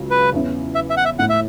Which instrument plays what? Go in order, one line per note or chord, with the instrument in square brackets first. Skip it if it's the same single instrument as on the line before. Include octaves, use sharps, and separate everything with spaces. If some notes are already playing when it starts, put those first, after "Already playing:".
Already playing: [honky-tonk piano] C#2 C#3 F#3
[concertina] B4
[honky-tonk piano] E2 E3 C#4 E4
[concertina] E5
E5
F#5
E5
[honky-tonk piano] A2 A3 E4 [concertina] F#5
[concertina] E5